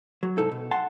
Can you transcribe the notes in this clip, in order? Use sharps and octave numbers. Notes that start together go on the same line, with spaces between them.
F#3
C2 G#2 D#4 A4
B2
F#5 A5 C6